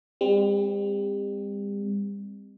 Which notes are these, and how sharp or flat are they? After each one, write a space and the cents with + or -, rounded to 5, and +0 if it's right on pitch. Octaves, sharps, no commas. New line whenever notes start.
G3 +40 C4 -10